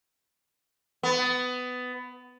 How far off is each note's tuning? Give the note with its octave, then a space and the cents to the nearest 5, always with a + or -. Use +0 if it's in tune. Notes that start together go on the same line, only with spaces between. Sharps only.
B3 +20